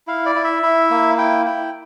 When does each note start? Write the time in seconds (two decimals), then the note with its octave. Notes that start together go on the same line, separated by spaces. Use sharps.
0.07 E4 F5
0.26 D5
0.35 E4
0.44 E5
0.63 E4
0.90 A#3
1.18 E4 G5
1.46 E4 G5